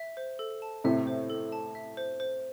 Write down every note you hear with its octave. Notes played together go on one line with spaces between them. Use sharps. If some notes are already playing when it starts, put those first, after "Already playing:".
Already playing: E5
C5
A4
A5
A2 C3 E5
C5
A4
A5
E5
C5
C5